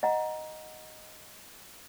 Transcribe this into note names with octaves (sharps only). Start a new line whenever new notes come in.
D#5 F#5 A#5